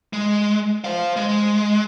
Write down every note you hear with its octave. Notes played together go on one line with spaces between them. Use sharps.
G#3
C5 F5
G#3